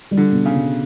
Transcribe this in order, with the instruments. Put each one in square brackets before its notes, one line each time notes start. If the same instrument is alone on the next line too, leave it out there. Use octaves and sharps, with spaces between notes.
[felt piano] G3
[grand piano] D3
[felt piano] B2
[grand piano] C#3
[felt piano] B2